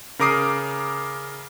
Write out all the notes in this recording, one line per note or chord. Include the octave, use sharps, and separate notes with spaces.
C#3 A#4 A#5 D6 D#6 C7